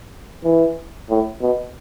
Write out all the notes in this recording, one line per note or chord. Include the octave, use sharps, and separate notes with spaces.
E3
A2
B2